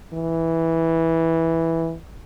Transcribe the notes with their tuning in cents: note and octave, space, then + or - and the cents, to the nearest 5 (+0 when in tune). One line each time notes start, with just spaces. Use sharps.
E3 -10